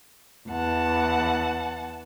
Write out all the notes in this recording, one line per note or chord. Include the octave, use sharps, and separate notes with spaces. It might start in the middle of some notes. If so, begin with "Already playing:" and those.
E2 F#5 A5